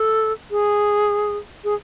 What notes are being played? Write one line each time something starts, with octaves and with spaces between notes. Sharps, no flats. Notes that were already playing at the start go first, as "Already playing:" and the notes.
Already playing: A4
G#4
G#4